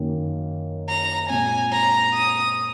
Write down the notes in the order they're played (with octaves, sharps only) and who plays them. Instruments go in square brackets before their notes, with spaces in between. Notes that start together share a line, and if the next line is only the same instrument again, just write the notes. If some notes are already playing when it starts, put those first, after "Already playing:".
Already playing: [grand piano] F#2 D#3 A#3
[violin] A#5
[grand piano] A#2 G#3 C4 [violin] G#5
[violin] A#5
D#6